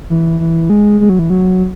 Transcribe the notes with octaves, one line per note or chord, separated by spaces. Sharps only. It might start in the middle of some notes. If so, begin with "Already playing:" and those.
E3
E3
G#3
G#3
F#3
E3
F#3